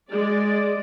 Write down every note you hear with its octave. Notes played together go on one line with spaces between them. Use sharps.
G#3 D5